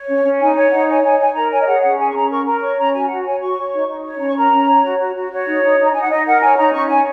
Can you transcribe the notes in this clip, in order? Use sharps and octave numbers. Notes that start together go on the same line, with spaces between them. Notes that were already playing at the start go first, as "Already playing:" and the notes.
Already playing: C#5
C#4
C#4
D#4 G#5
C#5 G#5
D#4 F#5
C#5 G#5
D#4 G#5
C#5 G#5
A#4 A#5
C#5 G#5
D#5
G#4 F#5
C#4 F#5
G#4 G#5
C#6
C#4 A#5
A#4 C#6
A#4 A#5
C#5 C#6
C#4 A#5
F#4 G#5
F#4 F#5
C#5 G#5
F#4 C#6
C#5
D#4
D#4
C#5
C#4 A#5
C#6
A#4 A#5
C#4
C#5
F#4
F#4
F#4
F#4 C#5
D#4
D#4
D#4
A#5
D#4 G#5
F#5
D#4 D#5
A#4 F#5
C#5 G#5
D#4 A#5
C#4 C#6
C#5 G#5